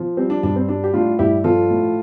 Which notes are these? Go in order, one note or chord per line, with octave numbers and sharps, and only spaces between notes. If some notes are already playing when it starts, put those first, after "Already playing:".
Already playing: F3
G3 C4
D4
G2 D4
C4
G3 D4
G4
A2 D4 F4
G2 E4 G4
F3 F4 A4
A2